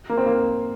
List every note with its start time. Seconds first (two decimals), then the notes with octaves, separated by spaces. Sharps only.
0.09 A#3
0.17 C4
0.26 A#3